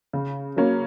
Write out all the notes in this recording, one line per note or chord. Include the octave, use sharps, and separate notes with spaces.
C#3
F#3 A#3 C#4